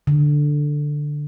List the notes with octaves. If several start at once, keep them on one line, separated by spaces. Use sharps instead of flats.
D3